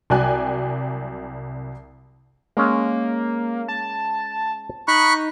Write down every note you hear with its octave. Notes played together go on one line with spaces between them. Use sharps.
C2 F#3 D5 G5 G#5 F#6
G#3 A#3 C#4
A5
D#4 B5 C#6 F#6